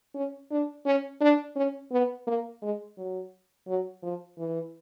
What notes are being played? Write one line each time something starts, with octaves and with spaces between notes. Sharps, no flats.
C#4
D4
C#4
D4
C#4
B3
A#3
G#3
F#3
F#3
F3
E3